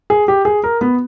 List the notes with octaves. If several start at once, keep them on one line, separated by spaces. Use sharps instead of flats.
G#4
G4
G#4
A#4
B3